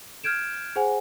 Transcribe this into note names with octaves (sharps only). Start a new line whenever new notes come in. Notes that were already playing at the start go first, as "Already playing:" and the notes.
F6 G6 G#6 D7 E7
G#4 C5 F#5 G#5